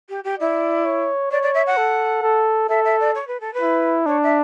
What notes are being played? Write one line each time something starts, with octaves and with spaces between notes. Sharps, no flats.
G4
G4
E4 D5
C#5
C#5 D5
D5
E5
F#5
A4
A4
A4 E5
E5
D5
C#5
B4
A4
B4
E4
D4 C#5
E5